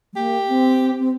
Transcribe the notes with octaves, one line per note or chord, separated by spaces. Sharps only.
G3
A#3 G4
C4
C4